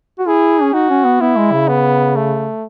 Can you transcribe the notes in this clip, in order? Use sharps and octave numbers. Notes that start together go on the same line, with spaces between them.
F#4
E4 G#4
C#4
D#4 F#4
C#4
B3
B3 E4
G#3
C#3
B3
A3